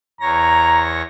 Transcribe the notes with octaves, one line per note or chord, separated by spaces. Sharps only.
E2 C#5 A#5 A#6